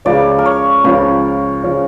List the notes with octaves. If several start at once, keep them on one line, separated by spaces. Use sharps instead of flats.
C#2 C#3 F3 C#4 D5
A#4
C#5
C#2 C#3 F3 C#4 A#4
C#3 F3 C#4